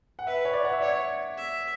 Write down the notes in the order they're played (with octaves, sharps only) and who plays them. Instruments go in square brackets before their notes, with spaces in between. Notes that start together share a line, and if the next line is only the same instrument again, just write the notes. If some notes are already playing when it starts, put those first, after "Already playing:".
[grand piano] F#5
[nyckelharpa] B4 [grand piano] E5
[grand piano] C#5
D5
F#5
E5
[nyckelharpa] C#5 [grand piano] D5
[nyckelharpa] E5